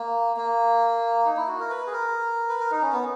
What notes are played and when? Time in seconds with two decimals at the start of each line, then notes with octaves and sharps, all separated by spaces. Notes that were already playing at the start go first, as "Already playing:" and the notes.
Already playing: A#3
0.37 A#3
1.26 D#4
1.37 E4
1.48 F#4
1.60 A#4
1.70 B4
1.87 G#4
1.93 A#4
2.49 B4
2.59 A#4
2.71 D#4
2.82 C#4
2.93 B3